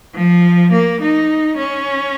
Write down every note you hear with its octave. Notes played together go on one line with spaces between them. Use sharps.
F3
A#3
D#4
C#4